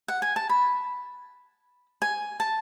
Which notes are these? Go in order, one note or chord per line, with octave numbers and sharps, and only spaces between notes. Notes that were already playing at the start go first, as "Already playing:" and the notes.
F#5
G#5
A5
B5
G#5
A5